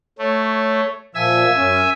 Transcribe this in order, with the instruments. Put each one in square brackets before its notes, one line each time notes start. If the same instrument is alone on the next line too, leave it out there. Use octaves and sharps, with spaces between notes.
[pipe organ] A3 [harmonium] C#5
[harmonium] A#2 F3 [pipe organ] E5 G#5 E6
[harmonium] F#2 C#4